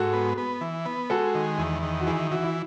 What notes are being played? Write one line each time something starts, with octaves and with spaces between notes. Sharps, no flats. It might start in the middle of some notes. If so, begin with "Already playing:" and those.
Already playing: G#2 F#4 A4
B3
B3
E3
B3
G#3 F#4 A4
D#3
E2
D#3
F#4
E3 E4 G#4
E3 F#4
E4